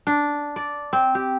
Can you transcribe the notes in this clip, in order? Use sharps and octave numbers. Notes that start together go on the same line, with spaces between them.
D4
D5
C4
G4